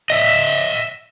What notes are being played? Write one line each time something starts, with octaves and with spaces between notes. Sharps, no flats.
D#5 E5